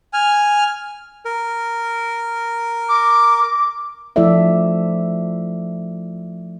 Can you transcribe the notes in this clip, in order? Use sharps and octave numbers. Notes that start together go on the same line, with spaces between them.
G#5 F6
A#4
D6
F3 A3 E4 A4 D5 E5